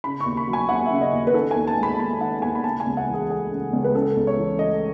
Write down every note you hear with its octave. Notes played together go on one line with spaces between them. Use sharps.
C#3 B5
C#6
D#2
B5
F#3
G#5
D#2 F#5
E5
C#3
D#5
D#2
B4
D#3 A4
G#5
D#2
A5
G#3
B5
D#2 B5
D#3 F#5
D#2 G#5
B5
C#3 A5
G#5
C#2
F#5
E3
G#4
A3 G#4
C#3
C#2
B4
C#3 A4
C#2
C#5
E3
A3 D#5